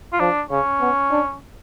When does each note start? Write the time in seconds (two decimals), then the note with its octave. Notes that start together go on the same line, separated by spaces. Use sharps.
0.13 F4
0.20 F3 D4
0.50 C#3 C#4
0.81 B3
1.11 D4